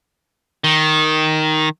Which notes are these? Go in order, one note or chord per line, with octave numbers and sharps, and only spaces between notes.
D#3